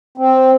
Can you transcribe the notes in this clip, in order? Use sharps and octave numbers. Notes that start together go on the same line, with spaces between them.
C4